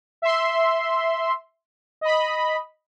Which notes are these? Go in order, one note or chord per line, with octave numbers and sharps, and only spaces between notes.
E5 C6
D#5 B5